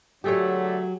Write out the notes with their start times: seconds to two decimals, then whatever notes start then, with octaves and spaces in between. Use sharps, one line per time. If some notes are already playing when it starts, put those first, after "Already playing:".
0.24 D3 F#3 A3 G4 G#4 C#5